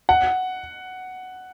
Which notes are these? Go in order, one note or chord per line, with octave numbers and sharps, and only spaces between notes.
F#5